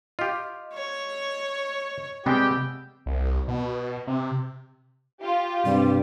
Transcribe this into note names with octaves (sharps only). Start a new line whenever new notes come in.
F4 G4 D#5
C#5
C3 G3 G#3 B3 G4 G5 E6
C2
B2
C3
F4 G4
G2 C3 G3